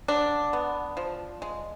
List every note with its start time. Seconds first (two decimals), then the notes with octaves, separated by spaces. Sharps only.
0.08 D3 D4
0.53 B3
0.97 F3
1.42 G#3